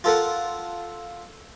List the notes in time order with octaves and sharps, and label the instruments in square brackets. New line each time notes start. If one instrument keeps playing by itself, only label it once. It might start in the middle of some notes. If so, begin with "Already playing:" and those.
[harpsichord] F4 A4 A#4 F#5